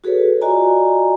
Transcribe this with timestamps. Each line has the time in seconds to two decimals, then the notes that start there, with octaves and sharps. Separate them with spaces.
0.04 F#4 G#4 A4 B4 C#5
0.41 F4 F#4 D5 D#5 G#5 A#5